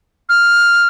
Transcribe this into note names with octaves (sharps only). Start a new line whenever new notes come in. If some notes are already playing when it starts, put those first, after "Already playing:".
F6